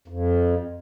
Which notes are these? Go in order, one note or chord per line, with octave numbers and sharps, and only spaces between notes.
F2